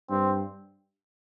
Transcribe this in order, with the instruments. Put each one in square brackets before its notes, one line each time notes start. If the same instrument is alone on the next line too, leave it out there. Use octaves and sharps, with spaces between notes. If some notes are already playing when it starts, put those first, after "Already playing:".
[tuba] G2 [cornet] C4